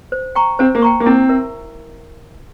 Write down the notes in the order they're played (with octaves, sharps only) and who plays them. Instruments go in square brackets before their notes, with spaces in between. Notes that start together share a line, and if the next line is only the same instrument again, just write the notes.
[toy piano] C5
G5 A#5 C#6
[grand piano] C4 [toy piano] C5
[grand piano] A#3
[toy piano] G5 A#5 C#6
[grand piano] A#3
[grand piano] C4 [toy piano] E4
[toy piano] A#4 E5